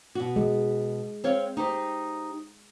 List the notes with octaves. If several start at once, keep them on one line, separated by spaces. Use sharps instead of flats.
B2 F#4
G#3
C4 C#5 F5
D#4 G4 C5